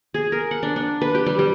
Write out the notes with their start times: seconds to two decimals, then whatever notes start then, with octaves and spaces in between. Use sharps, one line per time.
0.14 G#4
0.32 A#4
0.51 F#5
0.63 D4
0.76 D4
1.01 B4
1.15 G4
1.26 G3
1.39 G3